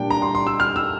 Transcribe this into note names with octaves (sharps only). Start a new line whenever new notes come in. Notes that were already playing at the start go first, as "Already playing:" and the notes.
Already playing: A#2 G3 D4 G5
A#5
C6
C6
E6
F6
E6